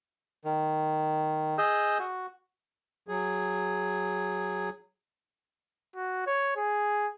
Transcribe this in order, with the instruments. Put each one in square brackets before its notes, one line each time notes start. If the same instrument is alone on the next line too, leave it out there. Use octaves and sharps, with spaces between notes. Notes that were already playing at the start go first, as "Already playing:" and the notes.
[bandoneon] D#3
G#4 D#5 E6 G6
F#4
[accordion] F#3 G#4
[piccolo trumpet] F#4
C#5
G#4